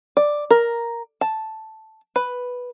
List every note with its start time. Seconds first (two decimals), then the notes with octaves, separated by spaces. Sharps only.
0.17 D5
0.51 A#4
1.21 A5
2.16 B4